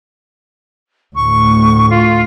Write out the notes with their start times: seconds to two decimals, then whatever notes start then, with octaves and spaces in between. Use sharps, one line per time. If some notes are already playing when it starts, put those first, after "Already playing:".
1.16 D2 A2 C#6
1.90 F4